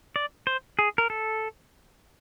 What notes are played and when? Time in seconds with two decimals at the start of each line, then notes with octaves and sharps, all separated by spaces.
0.16 D5
0.47 C5
0.79 G#4
0.98 A#4
1.10 A4